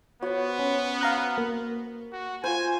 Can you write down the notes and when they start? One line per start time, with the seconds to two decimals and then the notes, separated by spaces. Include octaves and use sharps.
0.22 B3 F#4 C5 C#5
0.59 C#4
1.01 F5 A#5 F#6
1.38 A#3
2.12 F#4
2.44 F4 C5 G#5